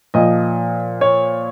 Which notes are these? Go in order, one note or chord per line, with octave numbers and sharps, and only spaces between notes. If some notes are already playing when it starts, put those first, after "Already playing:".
A#2 F3 D#5
C#5